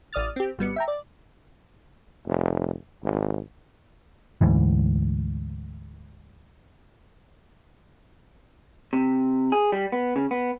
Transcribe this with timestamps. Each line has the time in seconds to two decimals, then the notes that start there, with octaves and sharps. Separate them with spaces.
0.13 A1 D5 D#6 F6 A6
0.36 C4 G4
0.59 G#1 G3 B3 C#7
0.76 E5 G5 A#5
0.88 D5
2.26 F1
3.04 G#1
4.41 D2 G#2 E3
8.93 C3
9.52 G#4
9.72 G3
9.92 B3
10.16 C#3
10.31 B3